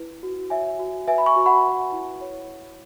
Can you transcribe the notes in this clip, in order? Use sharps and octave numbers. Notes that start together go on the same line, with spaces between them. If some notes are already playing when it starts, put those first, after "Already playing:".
Already playing: E4 B4
F#4
C#5 E5 G#5
F#4
B4 E5 G#5
B5
G#5 C#6
F#4
F#5 B5
B4
E4
C#5